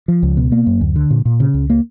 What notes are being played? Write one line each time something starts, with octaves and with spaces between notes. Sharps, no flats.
F3
C#2
B2
A#3
F#2
D2
D3
A#2
A#2
C#3
C#2
A#3